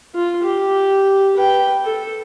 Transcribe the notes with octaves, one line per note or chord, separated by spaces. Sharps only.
F4
G4
B4 G5
A4